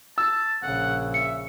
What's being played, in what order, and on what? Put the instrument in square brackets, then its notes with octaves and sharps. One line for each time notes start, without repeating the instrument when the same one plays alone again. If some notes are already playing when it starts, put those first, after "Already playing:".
[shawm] A5 [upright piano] E6
[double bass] A#1 C#3 [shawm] F#5
[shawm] E5 [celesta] C#7